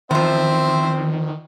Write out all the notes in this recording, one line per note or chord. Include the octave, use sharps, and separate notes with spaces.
E2 D#3 F3 C4 C5 E5